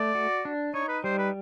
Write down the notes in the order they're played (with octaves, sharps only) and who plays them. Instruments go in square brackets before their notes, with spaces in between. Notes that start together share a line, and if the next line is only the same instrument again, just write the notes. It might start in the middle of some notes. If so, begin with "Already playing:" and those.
Already playing: [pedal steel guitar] A3 [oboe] D5
[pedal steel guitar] F#4
D4
[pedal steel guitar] D#4 [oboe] C#5
[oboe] B4
[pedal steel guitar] G3 [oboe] C5
[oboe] B4